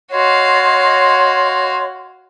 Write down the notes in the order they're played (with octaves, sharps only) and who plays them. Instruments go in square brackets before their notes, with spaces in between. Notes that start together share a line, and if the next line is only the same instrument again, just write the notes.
[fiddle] F#4 F5 [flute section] C#5 D#5 C6